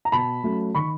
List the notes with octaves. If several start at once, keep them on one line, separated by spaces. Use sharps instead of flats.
A#5
B2 A5 B5
F#3 A3 C#4
D#3 B5 C#6